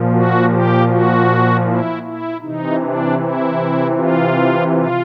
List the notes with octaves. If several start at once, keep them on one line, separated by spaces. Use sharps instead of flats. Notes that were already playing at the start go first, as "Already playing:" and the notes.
Already playing: A#2 F3
F#4
G4
F#4
E4
E4
C3 E3 D#4
D4
E4
F4
F4